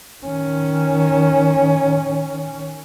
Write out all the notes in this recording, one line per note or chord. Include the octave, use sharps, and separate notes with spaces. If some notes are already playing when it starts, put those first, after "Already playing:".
D#3 C#4